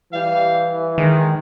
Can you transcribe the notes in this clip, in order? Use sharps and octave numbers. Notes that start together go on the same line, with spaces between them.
E3 G3 F5
D#3 G#3